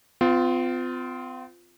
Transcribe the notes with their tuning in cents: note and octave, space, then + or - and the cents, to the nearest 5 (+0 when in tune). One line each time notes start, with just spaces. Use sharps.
C4 -45 F4 +0